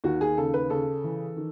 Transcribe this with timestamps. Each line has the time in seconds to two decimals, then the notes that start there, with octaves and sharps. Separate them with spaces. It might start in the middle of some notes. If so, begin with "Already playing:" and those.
0.04 D#2 F#4
0.21 G#4
0.38 C#3 A4
0.54 B4
0.70 C#3 A4
1.04 E3
1.36 D#3